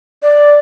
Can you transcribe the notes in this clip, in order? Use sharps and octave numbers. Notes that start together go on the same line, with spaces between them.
D5